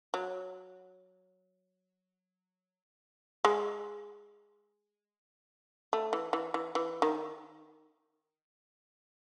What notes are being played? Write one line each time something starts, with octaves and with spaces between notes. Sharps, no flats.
F#3
G#3
A3
E3
E3
E3
E3
D#3